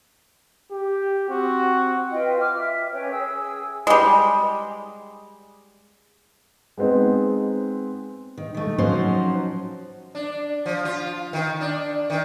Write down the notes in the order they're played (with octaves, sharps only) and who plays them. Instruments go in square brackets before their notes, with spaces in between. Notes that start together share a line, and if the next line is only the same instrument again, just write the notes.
[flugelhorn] G4
[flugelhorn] C4 [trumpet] F#4
[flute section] F4 B4 D#5 G5
D6 F6
E5
C#4 B4 C#5 G5
G#4 E6
[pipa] G3 G#3
[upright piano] G#3 B3 C4 D#4
[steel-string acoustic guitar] D#3
D#3 A3
F3 F#3 C#4 D#4 F#4 C5
[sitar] D4
F3
F4
D#3
D4
D#3